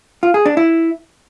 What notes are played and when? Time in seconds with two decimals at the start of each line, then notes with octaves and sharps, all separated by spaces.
0.23 F4
0.34 G#4
0.46 D4
0.57 E4